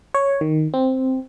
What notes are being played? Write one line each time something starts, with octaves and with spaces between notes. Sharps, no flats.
C#5
D#3
C4